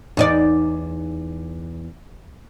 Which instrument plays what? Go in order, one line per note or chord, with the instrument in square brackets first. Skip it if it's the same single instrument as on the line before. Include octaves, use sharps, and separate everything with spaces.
[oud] E2 D#4 D5